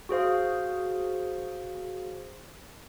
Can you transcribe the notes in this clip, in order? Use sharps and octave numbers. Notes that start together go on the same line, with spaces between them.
F#4 G#4 C5 F5